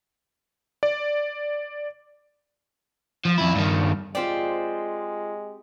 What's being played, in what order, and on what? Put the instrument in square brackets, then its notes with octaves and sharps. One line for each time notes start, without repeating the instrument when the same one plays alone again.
[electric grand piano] D5
[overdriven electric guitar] F3
F2 E4
G2 D#3
[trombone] G#3 [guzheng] C4 G4 [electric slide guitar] F4 C5 D5